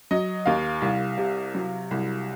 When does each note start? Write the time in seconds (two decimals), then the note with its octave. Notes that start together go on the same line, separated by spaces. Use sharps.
0.11 F#3 D#5
0.46 D#2 F5
0.82 C2
1.18 C3
1.55 F#3
1.91 C2